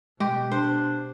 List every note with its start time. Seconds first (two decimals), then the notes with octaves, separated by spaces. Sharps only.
0.20 B2 G#3 G4
0.52 D4 C5